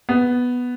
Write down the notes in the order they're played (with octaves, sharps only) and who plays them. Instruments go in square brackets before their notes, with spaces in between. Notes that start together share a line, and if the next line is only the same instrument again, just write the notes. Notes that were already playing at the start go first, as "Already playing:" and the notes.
[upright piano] B3